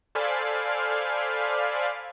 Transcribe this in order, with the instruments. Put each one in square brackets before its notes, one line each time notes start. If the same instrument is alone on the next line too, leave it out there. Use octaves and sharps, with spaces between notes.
[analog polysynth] A4 C5 D5 F5 G#5 B5